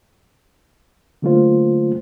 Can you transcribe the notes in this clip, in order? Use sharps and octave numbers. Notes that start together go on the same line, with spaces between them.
D3 F#3 A3 A#3 F4 C5